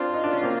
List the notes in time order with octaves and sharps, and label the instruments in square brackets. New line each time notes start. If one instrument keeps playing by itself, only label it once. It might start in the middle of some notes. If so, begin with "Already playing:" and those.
Already playing: [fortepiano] C4 D4 [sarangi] F4
[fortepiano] D#4
D4
C#4
A#3 C4